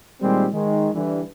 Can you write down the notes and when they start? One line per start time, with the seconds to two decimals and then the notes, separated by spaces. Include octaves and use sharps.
0.22 A#2 D#3 G3 G#3 C4 G4
0.53 D#3 G#3
0.94 D3 E3 G3